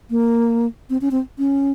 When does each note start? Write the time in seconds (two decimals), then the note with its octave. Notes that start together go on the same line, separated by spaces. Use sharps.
0.10 A#3
0.90 C4
1.01 C#4
1.11 C4
1.38 C#4